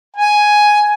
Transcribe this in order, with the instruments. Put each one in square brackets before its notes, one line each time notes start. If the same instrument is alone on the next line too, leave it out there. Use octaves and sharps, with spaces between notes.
[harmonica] G#5